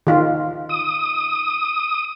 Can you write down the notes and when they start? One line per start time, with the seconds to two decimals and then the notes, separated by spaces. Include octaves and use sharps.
0.07 D#3 F4
0.69 D#6